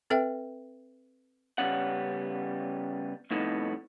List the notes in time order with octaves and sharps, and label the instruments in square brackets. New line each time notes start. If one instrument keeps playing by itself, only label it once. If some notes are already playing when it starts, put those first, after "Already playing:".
[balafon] C4 A4 B4 E5 G5
[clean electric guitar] C#3 G3 B3 C#4 F#5
C2 F2 A2 B3 D#4